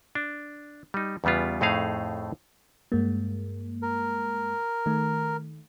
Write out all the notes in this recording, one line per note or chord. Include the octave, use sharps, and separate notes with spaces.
D4
G3 D#4
E2 C#3 G3 B3 F4
F2 A2 A3 D#4 G#4 F5
G2 G#3 A#3
A#4
D#3 A3